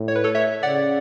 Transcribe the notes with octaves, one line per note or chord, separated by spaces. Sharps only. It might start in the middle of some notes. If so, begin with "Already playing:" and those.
Already playing: A2
C#5
B4
A4 C#5
C#5 E5
C#3 D5 F#5